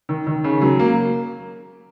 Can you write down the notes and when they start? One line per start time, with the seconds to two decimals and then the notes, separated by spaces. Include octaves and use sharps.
0.09 D#3
0.27 D#3
0.44 C#3
0.61 F#3
0.79 A#3